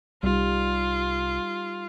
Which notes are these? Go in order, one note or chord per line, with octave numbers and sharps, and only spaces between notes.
C2 G3 D#4 F4